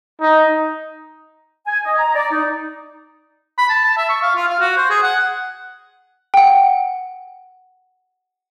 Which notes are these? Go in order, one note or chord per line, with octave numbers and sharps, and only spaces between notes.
D#4
G#5
D#5
A#5
D5
D#4
B5
A5
A5
E5
C#6
F5
F4
F5
F#4
C5
G#4
F#5
F#5 G5